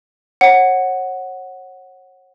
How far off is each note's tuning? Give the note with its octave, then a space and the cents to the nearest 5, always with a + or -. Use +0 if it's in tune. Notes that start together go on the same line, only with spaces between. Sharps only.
C#5 -35 F#5 +0